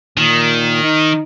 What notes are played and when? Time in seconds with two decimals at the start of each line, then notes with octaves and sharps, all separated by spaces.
0.18 A#2 D#3
0.83 D#4